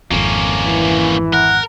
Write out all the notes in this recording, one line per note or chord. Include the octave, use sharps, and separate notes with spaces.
G#1 F2 A#3 C#4
E3
A#4 F#5